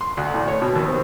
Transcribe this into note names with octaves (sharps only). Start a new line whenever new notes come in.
C6
D2
A2
C#5
B2
D#2
C4